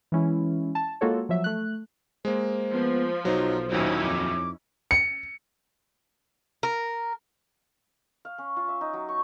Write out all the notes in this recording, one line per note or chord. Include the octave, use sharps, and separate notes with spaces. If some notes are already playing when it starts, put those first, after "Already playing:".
E3 G#3 C#4 E4
A5
G#3 A#3 F4 F#4 A4 C#5
F3 F#3 E5
A3 F#6
G#3 A#3 C5
F3 B3
B1 F#3 D#4 C5
D#2 A#2 F#3 C#4 D#4 E4
F2 D6
C#7
A#4
F5
C#4
F4
E5
D#4
F#3
C#6